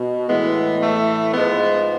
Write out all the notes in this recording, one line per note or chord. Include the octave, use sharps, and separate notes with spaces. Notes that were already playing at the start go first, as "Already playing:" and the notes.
Already playing: B2
A2 E3 G#3 B3
A3
G#2 F3 G#3 B3